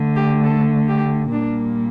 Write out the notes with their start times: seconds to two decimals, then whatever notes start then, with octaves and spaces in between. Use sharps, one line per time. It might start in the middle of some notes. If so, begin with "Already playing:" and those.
Already playing: D3 A3
0.15 G4
0.44 A4
0.87 G4
1.31 A#2 G3 A#3 D4